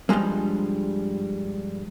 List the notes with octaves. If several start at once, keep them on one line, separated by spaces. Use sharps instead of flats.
G2 F3 G3 G#3 A#3